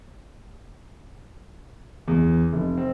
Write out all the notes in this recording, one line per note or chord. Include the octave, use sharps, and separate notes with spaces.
E2
F1
C4